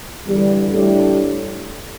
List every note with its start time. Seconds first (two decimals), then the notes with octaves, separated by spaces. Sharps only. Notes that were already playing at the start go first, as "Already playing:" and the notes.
0.25 E2 D3 G3
0.72 A2 G3 D4 G4